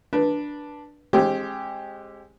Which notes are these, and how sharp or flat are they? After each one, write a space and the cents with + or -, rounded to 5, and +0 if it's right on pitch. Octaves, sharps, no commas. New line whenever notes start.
D4 +0 B4 -20
G#3 +0 C4 +35 G4 +0